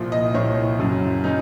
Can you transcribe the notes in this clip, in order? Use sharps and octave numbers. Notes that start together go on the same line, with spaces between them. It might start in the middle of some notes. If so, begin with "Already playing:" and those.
Already playing: C2 A#2 F3
D#5
C2 A#2 F3 C#5
F#2 C#3 F#3
C#3 F#3 D#4